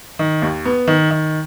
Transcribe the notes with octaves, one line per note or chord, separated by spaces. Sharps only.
D#3
D#2
B3
D#3
D#3